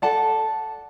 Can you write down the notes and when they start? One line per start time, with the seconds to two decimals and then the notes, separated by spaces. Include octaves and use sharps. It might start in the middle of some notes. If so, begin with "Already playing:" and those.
0.02 A4 D5 F#5 A5